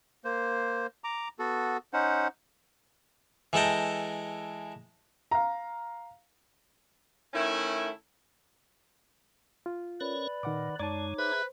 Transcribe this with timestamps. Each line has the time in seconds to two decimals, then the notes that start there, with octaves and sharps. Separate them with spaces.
0.24 A#3 C5
1.04 A#5 D6
1.39 B3 F#4 A4
1.93 C#4 D#4 C5 F#5
3.53 E3 G#3 A4 G5 A#5
5.31 F5 A#5
7.34 D#3 A3 C#4 E4
9.66 F4
10.01 C#4 A#4 B4 C#5 D5 B5
10.43 A#2 D#3 F#5 D6
10.80 F#2 G#3 D#4 C#5 D5 A5 D6
11.19 G#4 B4 C5 E5